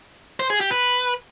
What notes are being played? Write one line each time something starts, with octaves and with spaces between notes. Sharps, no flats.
C5
G#4
G4
B4